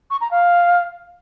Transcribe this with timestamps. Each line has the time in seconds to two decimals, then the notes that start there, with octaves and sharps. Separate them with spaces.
0.11 C#6
0.21 A#5
0.31 F5